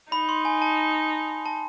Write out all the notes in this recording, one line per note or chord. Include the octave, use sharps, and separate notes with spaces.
D#4 B5
C6
G#5
A5
A5